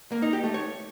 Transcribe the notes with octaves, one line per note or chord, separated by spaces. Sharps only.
A#3
D#4
G4
A3
C#5